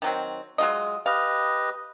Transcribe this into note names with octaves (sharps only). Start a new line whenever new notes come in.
D#3 F#3 C4
F#3 G#3 F4 D#5
G4 B4 D#5 F5